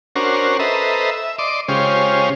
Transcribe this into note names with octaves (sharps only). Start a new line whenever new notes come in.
C#4 D4 F#4 A#4 C5
A4 B4 C5 D#5 E5 A#5
E5
D5 D#5 C6 D6
C#3 G#3 C#4 F4 G4 C5